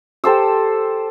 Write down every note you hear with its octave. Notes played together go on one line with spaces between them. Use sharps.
G4 A4 C5 E6